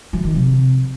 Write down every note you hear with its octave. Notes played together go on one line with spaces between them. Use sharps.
F#3
D#3
C3